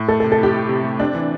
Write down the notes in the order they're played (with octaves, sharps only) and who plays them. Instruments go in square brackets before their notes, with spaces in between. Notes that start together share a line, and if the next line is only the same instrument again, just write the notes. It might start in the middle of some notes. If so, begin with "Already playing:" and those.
Already playing: [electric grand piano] A2
[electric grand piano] A3 [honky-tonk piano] A4
[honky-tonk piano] A4
[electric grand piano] C3
[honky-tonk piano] A4
[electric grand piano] E4 [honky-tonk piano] G4
[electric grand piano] E4
C3
A3
[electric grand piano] C4 [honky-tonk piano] D4
[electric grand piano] E3